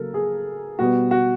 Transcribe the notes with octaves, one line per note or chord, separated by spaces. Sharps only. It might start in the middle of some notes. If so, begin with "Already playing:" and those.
Already playing: C#3 F#3 A#3 A4 A#4
G#4
B2 G3 B3 F#4
F#4